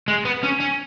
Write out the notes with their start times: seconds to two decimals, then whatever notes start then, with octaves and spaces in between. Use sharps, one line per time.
0.08 G#3
0.25 B3
0.43 C#4
0.60 C#4